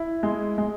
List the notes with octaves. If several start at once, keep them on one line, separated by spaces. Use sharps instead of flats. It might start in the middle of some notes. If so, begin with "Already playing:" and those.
Already playing: E4
G#3
G#3